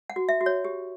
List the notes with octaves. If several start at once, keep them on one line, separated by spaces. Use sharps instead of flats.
F#5
F#4
E5
F#4
C#5
G4